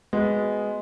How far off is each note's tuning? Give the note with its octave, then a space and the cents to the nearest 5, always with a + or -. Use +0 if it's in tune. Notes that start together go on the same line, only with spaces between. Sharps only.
G#3 +0 B3 +10 F#4 -15